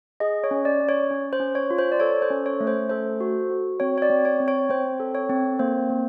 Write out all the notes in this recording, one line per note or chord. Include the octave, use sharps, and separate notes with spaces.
G#4 D#5
C#5
C#4
D5
C#4
C#5
C#4
C5
C#4
C#5
F4
C5
D5
A4 C#5
C5
C#4
C#5
A3
C5
A4 C5
F#4
F#4
C4 C#5
C#5
D5
C4
C#5
C4
C#5
C4 C5
A4
C#5
C4
A#3 C5
A#3